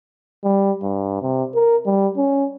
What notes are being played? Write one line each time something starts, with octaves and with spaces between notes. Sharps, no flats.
G3
G2
C3
A#4
G3
C#4